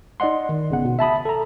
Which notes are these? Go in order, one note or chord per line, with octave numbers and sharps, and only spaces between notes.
D#4 D5 D#5 F#5 C6
D#3
G#1 C#3 B3 F#5
B2
E5 A5 B5 D#6
A4 A#5